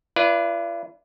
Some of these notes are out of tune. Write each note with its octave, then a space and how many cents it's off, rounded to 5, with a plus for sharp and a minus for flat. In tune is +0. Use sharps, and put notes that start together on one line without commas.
F4 -45 B4 +0 D5 +0